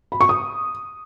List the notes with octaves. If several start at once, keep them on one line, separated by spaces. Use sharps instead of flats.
B5
C#6
D#6